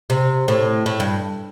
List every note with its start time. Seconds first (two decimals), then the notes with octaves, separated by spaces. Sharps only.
0.10 C3
0.48 A2
0.86 A2
1.00 G2